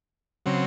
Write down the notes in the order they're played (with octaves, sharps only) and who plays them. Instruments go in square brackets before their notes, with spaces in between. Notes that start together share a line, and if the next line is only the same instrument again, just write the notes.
[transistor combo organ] C#3 F#3 C4